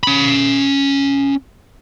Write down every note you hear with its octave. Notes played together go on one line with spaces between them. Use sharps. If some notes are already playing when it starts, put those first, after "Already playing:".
C#4 B5